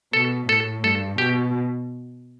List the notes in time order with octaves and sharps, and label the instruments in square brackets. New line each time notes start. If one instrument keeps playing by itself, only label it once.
[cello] B2 [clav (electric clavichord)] A4
[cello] A2 [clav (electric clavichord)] A4
[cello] G2 [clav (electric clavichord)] A4
[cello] B2 [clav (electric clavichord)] G4